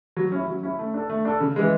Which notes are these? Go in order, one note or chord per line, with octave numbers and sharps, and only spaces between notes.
F#3
C#4 E4
F#3
C#4 E4
A3
D4 A4
A3
D4 A4
C#3
E3 G#3